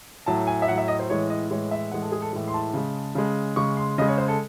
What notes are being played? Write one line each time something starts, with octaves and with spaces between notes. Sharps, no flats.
A2 F#3 A5
G#5
E5
A2 F#3 F#5
E5
D#5
C5
A2 E3 G#3 C#5
D#5
A2 E3 G#3 C#5
E5
A2 E3 G#3 F#5
A4
G#4
A4
A2 E3 G#3
C6
A5
C#3 G#3
C#3 G#3
C#3 G#3 C#6
C6
C#3 G#3 D#5
C#5
C5
A4